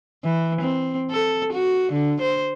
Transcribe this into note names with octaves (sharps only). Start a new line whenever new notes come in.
E3
C4
A4
F#4
D3
C5